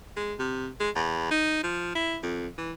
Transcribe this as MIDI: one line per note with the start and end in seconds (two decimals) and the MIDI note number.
0.17 0.34 56
0.39 0.68 48
0.80 0.90 56
0.95 1.27 40
1.31 1.63 63
1.63 1.93 53
1.95 2.18 64
2.23 2.47 41
2.58 2.72 52